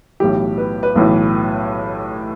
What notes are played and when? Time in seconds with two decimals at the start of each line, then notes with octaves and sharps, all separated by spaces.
0.20 B1 A2 E3 G4
0.58 B4
0.83 B4
0.96 B1 A2 E3